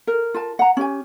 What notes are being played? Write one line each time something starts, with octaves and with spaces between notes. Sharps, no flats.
A#4
F4 A#4 A5
F#5 A#5
C#4 G4 G#5